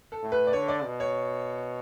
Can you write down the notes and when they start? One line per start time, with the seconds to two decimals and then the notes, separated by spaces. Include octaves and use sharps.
0.12 A4
0.23 A2
0.32 B4
0.47 D5
0.53 D3 C#5
0.68 D5
0.84 B2
1.00 C#5